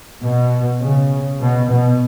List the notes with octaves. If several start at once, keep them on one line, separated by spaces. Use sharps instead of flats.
B2
C#3
B2
B2